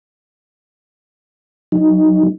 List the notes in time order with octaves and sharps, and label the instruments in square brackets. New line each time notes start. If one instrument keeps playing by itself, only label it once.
[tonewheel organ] F#3 D#4